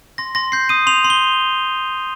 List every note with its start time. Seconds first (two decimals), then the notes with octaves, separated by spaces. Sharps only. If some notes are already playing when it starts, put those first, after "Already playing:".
0.18 C6 A#6
0.35 C6 A#6
0.52 G6 C7
0.69 D#6 D#7
0.87 C6 F7
1.04 C6
1.10 G7